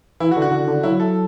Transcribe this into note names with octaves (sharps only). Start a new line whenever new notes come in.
E3 E4
F#4
D3
F#4
D3
D3
F#3 E4
A4